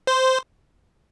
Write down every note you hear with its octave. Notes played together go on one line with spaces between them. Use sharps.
C5